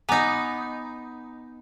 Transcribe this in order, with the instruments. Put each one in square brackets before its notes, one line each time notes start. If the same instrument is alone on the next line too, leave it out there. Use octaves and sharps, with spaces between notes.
[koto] B3 D#4 [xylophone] G#5 A#5 D6